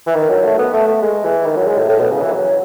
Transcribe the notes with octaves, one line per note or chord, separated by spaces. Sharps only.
E3
D#3
F#3
A3
B3
A3
A3
G#3
E3
D#3
F#3
G#3
A2
A2
B2
C#3
E3
F#3